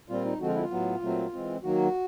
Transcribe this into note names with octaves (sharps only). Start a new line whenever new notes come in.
A#2 G3 C4 F4
D#4
D3 F3 G#3 C4 F#4
F4
E4
F4
A2 F#3 B3
A#2 F#3 A3 C4
E3 G#3 C4
D#3 F#3 A#3 F#4